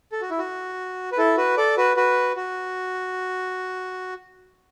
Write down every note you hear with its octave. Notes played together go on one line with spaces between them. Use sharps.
A4
F#4
E4
F#4
B4
E4 A4
F#4 B4
A4 D5
F#4 B4
F#4 B4
F#4